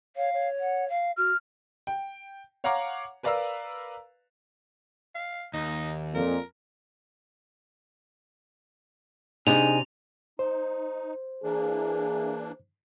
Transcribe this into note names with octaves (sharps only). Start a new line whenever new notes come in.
C#5 F5
C#5
F#5
F5
F#4 F6
G5
C#5 F5 F#5 A#5 D6
A#4 B4 D5 F5 A#5 E6
F5
D#2 D#4
F2 A#2 A#4
C3 D4 D#4 G#4 G#5 F7
D#4 C5
E3 A#3 D4 G#4